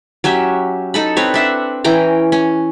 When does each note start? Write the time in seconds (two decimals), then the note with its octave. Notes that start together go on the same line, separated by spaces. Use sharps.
0.24 F#3 C#4 G4 E5
0.94 D#4 A4 B5
1.17 C4 B4 C#5
1.34 D4 E5 F#5
1.84 E3 C#4 G5 A#5
2.32 C#4